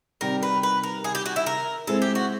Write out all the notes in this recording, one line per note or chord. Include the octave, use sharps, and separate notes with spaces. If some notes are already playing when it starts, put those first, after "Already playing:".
C3 D#3 G3 A#4
B4
B4
A#4
G#4
G4
F#4
E4
A#4
G#3 C4 E4 G#4 A4
G4
F#4